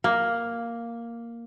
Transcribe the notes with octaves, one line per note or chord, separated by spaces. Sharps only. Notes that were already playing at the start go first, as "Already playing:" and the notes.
A#3